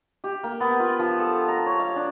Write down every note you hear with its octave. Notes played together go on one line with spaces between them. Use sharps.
G4
A#3
B3
F4
F3
A4
A#5
C#5
F5
D4